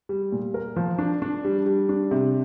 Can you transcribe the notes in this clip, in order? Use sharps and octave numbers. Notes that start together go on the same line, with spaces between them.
G3
A#2
A#4
F3
D4
D4
G3
G3
D4
C3